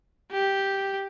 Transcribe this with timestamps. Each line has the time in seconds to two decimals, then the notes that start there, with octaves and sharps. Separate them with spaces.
0.32 G4